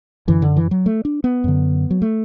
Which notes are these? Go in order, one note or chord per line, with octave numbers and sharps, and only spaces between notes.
F#2 D3 E3
D3
E3
F#3
A3
D4
B3
F#2 D3
F#3
A3